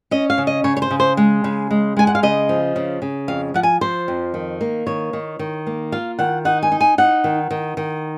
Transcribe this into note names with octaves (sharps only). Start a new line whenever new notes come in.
C#4 D#5
F5
C#3
D#5
C#3 C#5
C#5
C5
C#3
C5
G#3
C#3
G#3
G#3 G#5
F#5
F5
C#3 D#5
F3
C#3
C#3
F2 F5
F3 F#5
G#5
F3 C5
F2
D#3
A#3
D#3 C#5
D#3
D#3
A#3
F4 F5
D#3 F#5
D#4 F#5
G#5
D#4
G#5
D#4 F#5
D#3
D#3
D#3